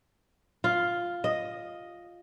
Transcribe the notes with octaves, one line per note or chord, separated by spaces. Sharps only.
F4
D#5